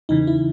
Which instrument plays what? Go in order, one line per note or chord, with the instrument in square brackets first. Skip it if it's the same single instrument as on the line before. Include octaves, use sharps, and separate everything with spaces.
[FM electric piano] E2 C#3 E3 D#4
E4